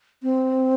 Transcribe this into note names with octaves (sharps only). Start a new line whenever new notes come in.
C4